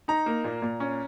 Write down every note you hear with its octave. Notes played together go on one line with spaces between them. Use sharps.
D#4 A#5
A#3
A#2
A#2
C#4